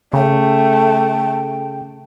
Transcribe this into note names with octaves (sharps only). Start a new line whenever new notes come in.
C#3 A3 G5